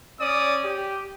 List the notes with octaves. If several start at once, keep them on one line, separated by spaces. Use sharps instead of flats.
C#4 D5 D#6
G4